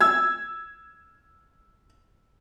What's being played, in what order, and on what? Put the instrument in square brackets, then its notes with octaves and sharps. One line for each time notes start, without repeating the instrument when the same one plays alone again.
[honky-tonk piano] E6 G#6